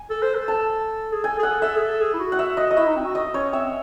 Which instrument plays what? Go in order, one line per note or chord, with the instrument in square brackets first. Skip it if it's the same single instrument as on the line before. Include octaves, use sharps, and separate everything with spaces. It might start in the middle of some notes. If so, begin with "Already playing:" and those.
Already playing: [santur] G#5
[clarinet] A4
C5
A4
[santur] A5
[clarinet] G#4
[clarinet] A4 [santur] G#5
[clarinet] G#4
[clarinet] A4 [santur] F#5
[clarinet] A4 [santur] E5
[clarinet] G#4
A4
G#4
E4
F#4
[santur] F#5
E5
D#5
D#5
[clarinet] E4 [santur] E5
[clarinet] D#4
C4
F#4
[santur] D#5
[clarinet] C#4 [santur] C#5
[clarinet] C4 [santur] E5